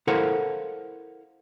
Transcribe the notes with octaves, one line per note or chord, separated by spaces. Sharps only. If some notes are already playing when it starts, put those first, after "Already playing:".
E4 A4 A#4 C5 F5 F#5